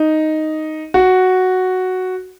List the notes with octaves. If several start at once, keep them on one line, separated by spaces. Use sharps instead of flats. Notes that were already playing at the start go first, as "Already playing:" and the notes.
Already playing: D#4
F#4